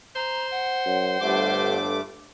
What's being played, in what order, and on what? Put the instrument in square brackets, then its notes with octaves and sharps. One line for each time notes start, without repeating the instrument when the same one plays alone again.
[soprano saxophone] C5 [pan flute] A#5
[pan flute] F#5
[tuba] F#2
[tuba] G1 [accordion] G2 A3 D6